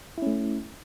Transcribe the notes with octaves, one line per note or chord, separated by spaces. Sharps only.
A3 C#4 E4